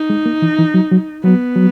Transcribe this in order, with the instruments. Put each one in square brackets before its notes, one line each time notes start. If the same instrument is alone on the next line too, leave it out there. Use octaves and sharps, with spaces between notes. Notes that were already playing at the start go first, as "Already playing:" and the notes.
Already playing: [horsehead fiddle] D#4
[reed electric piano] G#3
A#3
E3
E3
F#3
F#3
[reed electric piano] F#3 [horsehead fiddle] B3
[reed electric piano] F#3